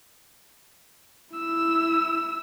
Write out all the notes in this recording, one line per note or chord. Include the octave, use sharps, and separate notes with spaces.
E4 E6